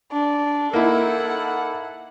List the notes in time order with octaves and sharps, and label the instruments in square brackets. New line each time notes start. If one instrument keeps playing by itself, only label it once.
[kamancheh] D4
[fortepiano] A#3 D#4 E4 [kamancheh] A4 F#5